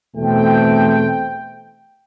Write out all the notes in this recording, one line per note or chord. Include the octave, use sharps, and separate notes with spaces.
E2 B2 A3 C4 G5